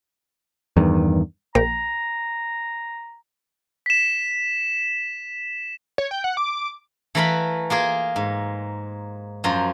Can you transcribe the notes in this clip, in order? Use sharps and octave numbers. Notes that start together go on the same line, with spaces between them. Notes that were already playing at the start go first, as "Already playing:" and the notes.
E2 G2 D#3
A#1 A#3 G5 A#5
B6 E7
C#5
G5
F#5
D6
E3 A3 A#4 B4 F5 B5
A#3 F4 G#4 A#4
G#2
F#2 F3 F4 A#5